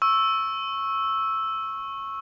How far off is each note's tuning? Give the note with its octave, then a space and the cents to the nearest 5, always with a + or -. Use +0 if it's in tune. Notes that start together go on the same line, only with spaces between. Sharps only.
C#6 -15 E6 +0